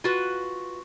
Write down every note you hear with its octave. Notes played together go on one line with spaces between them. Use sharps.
F4 F#4 B4